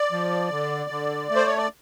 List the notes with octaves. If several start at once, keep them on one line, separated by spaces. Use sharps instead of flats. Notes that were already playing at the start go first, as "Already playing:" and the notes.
Already playing: D5
F3
D3
D3
A3
C5
C#5
D5